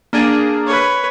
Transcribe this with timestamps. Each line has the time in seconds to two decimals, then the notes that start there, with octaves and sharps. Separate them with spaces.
0.13 A#3 D4 G#4
0.67 B4 C#5